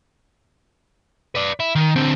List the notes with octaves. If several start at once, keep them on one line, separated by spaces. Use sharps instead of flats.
B4 D5
E4
D#3
D3 C4